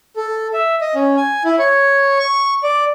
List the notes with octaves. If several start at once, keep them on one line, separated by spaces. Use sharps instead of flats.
A4
E5
D#5
C#4
G#5
E4
C#5
C#6
D5